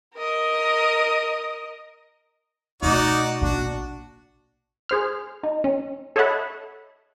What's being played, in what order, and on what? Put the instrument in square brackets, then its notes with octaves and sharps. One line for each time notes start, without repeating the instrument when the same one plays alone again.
[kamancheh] A#4 D#5
[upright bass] B2 A3 [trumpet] D#4 [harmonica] F#4 D5
[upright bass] A#1 B2 [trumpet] D4 [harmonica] F#4
[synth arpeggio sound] G#4 C5 F6
D#4
C#4
A4 C#5 D#5 E5 F#5 B5